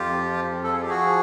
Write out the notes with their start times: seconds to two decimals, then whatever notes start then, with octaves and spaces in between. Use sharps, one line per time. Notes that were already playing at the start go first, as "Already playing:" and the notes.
Already playing: F2 F4 G4
0.11 F3
0.37 F2
0.64 F3 A4
0.73 G#4
0.81 G4
0.89 F3 F#4 G#4